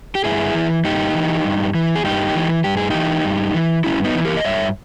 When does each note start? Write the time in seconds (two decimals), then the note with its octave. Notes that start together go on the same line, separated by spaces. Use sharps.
0.15 G4
0.24 G2 E4 G#4
0.55 E3
0.84 G2 D#4 G4
1.15 E3
1.44 G2
1.75 E3
1.95 G#4
2.04 G2 D#4 G4
2.35 E3
2.64 G2 G4
2.77 G#4
2.90 E3 D#4 G4
3.25 G2
3.54 E3
3.84 G2 C#4 E4
4.04 B3 D#4
4.15 E3
4.25 G4 A#4
4.37 D#5
4.44 G2 C#5 E5